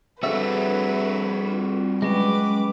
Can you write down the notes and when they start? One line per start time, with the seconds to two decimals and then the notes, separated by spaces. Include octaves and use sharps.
0.23 G3 C4 D4 F#4 G#4 A4 B4 E5
1.47 C4 F4
2.02 F#3 G#3 C#4 B4 G5 D6